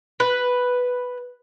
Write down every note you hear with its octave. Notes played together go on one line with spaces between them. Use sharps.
B4